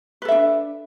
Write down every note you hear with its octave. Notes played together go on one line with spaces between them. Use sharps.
D4 A4 B4 E5